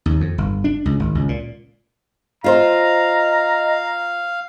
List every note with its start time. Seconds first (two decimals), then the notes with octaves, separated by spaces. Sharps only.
0.06 D#2
0.21 F2
0.38 G1
0.64 D4
0.85 C#2
0.99 G#1
1.15 C#2
1.29 A#2
2.44 F4 C5 D#5 F5 A#5